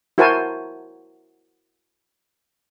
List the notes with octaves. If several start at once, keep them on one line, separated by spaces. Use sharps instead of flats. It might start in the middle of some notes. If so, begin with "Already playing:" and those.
E4 F#4 A#4 C5 G#5 A5